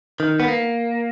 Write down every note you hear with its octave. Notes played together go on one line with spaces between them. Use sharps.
D#3
B3
A#3